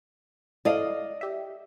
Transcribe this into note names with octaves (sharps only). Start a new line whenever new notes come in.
E4 A4 D5 D#5 F5
G4 E5